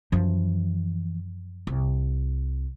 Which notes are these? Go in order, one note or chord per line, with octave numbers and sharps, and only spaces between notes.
F#2 E3 F3
C2